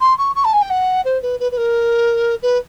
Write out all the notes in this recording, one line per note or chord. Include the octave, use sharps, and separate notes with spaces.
C6
C#6
C#6
A5
G#5
G5
F#5
C5
B4
B4
B4
A#4
B4